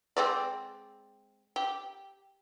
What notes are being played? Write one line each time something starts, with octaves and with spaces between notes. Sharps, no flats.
G#3 C4 D5
G4